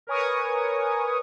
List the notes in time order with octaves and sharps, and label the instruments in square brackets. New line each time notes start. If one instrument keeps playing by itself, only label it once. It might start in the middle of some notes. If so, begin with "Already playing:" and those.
[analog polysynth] A#4 B4 C#5 G#5 C#6 D#6